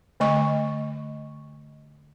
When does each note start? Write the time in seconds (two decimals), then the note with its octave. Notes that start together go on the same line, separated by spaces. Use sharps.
0.20 D3 A3 D#5 C#6